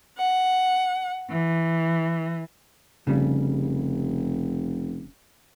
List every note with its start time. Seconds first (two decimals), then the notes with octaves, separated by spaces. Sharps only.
0.18 F#5
1.31 E3
3.07 F1 C#3 G3